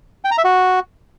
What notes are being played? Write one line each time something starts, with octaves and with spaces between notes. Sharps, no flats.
G5
A#5
E5
F#4